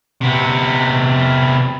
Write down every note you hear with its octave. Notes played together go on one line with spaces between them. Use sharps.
C3 B3